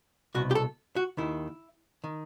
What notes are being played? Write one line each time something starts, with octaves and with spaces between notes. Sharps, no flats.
C2 B2 F#4
G4
A4
F#4
D#2 D#3 E4
D#3